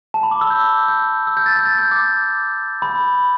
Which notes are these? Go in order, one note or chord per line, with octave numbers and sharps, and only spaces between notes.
A5
B5
D6
E6
G6
G6
E6
G6
A6
G6
A6
G6
D6
B5